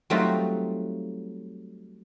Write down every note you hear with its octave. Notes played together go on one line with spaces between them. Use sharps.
F#3 G3 A3 C4 D#4 F4